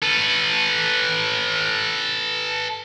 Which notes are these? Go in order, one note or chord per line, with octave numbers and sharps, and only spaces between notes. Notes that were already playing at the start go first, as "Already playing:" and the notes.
A4 B4